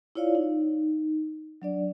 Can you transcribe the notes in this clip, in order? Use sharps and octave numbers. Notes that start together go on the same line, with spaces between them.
E4 F4 C#5 D5 F5
D#4
F#3 D4 D5